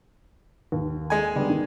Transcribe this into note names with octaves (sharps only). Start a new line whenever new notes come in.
D#2
G#3 G#5
D3 G3 B3
D#3